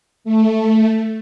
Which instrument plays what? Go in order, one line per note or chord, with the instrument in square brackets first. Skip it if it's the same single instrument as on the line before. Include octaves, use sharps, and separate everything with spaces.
[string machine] A3